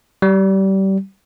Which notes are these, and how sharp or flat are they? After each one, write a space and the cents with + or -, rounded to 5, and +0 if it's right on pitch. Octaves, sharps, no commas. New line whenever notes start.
G3 -25